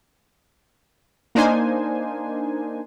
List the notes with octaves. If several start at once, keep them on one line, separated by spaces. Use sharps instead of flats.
A#3 D4 D#4 C5 G#5